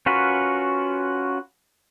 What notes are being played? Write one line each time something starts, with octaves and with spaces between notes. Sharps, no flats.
C#4 F4 F#4 A#4 B4